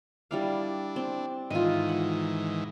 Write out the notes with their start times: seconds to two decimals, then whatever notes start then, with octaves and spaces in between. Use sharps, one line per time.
0.31 G3 D4 E4 F5
0.96 C4
1.51 G#2 D#3 E3 F4 D#5
1.89 F#5